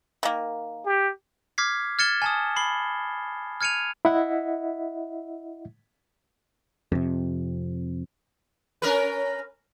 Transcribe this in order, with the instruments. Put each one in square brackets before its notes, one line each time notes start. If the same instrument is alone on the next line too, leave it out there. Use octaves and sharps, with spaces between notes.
[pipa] D#3 A#3
[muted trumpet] G4
[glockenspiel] D6 F6 G#6 B6 C7
F6 G#6 A6 C#7 E7 G7
G#5 A5 D#6
B5 C7 G7
F6 G#6 C#7 D#7 F7
[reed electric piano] E4 D#5 E5 F#5
[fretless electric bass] F2 C3
[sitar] C#4 A#4 B4